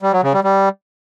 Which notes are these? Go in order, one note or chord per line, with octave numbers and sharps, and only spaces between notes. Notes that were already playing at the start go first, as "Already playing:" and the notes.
G3
F#3
C#3
G3
G3